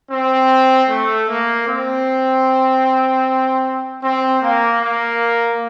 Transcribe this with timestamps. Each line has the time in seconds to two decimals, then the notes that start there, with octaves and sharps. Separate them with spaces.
0.11 C4
0.89 A3
1.28 A#3
1.68 C4
4.03 C4
4.43 A#3
4.82 A#3